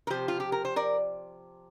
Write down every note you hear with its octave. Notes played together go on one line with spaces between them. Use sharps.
A#4
C3 F3 G4 C5
F4
G4
A#4
C5
A#4 D5